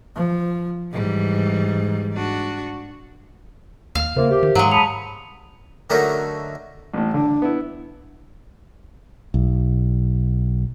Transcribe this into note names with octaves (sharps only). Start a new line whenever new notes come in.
F3
G#2 E3 G3
D4 F#4
D#2 F5
C#3 A#3 F4 A#4 C5 E5
G4
D#3
G#2 F#3 G#3 F5 A#5
A5 B5 D#6 C#7 F7
D3 F#3 A3 D#4 F#4 A#4
A1 A2
D3 D4
B3 E4
B1